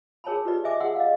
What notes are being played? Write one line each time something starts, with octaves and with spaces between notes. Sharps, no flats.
G#4 A#4 C#5 G#5 A5 B5
F4 G4 B4 D5
D#5 E5 G#5 D6
G#4 F#5 C6 E6
D#5 F5